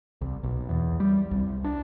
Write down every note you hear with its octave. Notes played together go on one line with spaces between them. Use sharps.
C2
B1
E2
G3
C2
D4